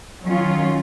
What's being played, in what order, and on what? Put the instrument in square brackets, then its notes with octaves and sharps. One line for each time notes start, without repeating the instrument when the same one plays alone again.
[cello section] D#3 F#3 C#4 F4